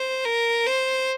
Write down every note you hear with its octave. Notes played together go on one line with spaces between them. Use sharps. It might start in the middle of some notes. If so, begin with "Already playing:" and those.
Already playing: C5
A#4
C5